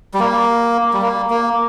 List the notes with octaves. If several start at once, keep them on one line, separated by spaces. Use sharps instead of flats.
G3
A#3
G3
A#3
A#3